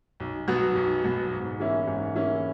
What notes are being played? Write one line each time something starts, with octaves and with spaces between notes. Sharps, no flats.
B1
B2 F#3 B3 F#4
B1
B2 F#3 B3 F#4
G#2
E3 A#3 C#4 E4
G#2
E3 A#3 C#4 E4